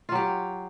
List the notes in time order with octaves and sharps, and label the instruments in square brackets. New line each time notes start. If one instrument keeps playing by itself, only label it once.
[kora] F4
F#3
G4